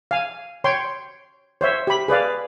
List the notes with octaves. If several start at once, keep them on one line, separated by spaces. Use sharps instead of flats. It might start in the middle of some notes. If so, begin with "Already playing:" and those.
F5 G#5
C#5 G5 C6
C5 C#5 E5
G4 B5
G#4 B4 D5 F5